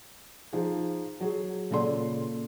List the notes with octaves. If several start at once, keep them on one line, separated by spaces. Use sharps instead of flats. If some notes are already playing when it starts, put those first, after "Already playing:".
F3 D#4 G#4
F#3 G#4
A#2 C#3 A4 D5 C6